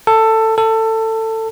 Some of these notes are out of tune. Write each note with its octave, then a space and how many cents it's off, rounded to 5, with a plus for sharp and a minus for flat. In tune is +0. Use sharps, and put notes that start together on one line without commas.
A4 +15
A4 +20